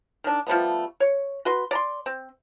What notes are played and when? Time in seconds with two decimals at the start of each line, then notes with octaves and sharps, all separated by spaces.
0.24 D#3 D4
0.47 F3 G3 A3 B3
1.00 C#5
1.45 F#4 B4 C6
1.71 D5 A#5 C6
2.06 C4